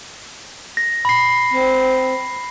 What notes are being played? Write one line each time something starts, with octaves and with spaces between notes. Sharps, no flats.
A#6
B5 C7
C4